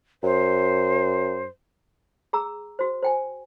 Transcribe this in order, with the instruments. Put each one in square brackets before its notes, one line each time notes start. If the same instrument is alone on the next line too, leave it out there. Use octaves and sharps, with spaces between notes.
[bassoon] F#2 [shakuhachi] C5
[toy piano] G#4 A#5 E6
F#4 C5
C5 G5 G#5